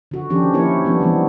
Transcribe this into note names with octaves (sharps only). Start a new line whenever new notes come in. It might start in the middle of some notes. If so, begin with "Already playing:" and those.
D3 F#4
D#3 F3 C#4 D4 G4
F3 A#3 E4 G4 A#4 C#5
F3 G3 B3 D4
D#3 E3 G3 B3